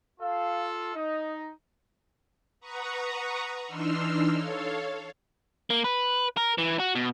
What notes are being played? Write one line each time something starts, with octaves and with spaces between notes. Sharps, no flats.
F4 A4 F5
D#4 D#5
B4 F#5 A#5 C#6 D#6
E3 D4 D#4 C6 E6 F6
A4 C#5 F5
A#3
B4
A#4
E3
F#4
B2